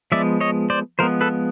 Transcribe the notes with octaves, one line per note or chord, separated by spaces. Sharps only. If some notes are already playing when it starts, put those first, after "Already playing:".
F3 G#3 B3 D5 E5
C#5 D#5
C5 D5
F3 G#3 B3 A#4 C5
A4 B4